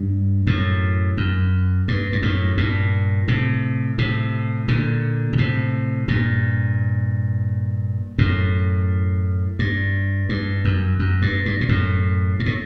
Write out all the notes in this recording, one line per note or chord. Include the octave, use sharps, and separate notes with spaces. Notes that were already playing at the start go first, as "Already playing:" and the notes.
Already playing: G2
F#2 A2
F#2
G2
G2
F#2 A2
G2 A#2
A2 C3
A2 C3
A#2 D3
A#2
A2 C3
G2 A#2
F#2 A2
G2
G2
F#2
F#2
G2
G2
A#2
F#2 A2
G2
A2